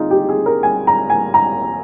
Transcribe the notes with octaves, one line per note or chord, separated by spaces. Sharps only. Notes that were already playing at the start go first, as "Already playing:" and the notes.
Already playing: D3 D#4 F4 G#4
G4
G#4
A#4
G#5
A#5
G#5
A#5